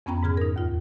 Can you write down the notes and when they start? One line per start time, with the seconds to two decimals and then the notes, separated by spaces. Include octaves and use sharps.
0.06 F2 B3 C#4 G5 A#5 B5
0.23 G#2 C#3 G#4 F6 G#6
0.37 D#4 A#4
0.56 D#2 F4